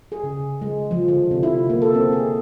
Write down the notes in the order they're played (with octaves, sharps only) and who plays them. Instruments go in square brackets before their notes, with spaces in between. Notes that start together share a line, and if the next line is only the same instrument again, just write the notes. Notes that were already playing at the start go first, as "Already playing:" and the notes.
[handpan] G#4
C#3
G#3
F3
D3
C3
E4
A#3
A4
C4
G#4